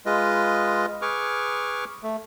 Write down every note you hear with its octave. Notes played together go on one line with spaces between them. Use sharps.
G#3 F4 B4 D#5
G#4 B4 C#6 D6 F6
A3